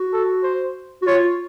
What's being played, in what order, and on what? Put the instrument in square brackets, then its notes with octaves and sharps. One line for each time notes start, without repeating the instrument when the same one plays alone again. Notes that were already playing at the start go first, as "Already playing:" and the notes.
Already playing: [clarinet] F#4
[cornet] A4
C5
[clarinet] F#4
[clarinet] F4 [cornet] C#5